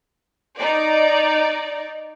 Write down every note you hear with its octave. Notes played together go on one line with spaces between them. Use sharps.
D#4 D5